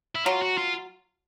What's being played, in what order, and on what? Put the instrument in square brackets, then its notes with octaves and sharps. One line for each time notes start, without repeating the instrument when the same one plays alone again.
[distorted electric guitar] E4
[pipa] F#3 [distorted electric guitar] F4
[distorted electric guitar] F#4
F4